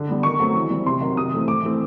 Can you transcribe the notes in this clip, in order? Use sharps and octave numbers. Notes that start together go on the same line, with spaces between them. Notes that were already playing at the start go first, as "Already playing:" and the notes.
Already playing: D3
G3 B3
D#3 C#6
F#3 A3 C4
E3
G3 C4
C3 C6
D#3 F#3
C3 D#6
E3 A3 C4
A2 D6
E3 A3 C4